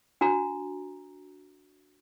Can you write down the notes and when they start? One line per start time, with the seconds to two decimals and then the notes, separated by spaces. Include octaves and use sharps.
0.21 D4 F#4 A#5